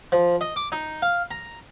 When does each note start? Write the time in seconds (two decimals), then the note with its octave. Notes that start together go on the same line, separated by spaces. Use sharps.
0.12 F3
0.41 D#5
0.56 D6
0.72 D#4
1.02 F5
1.31 A#5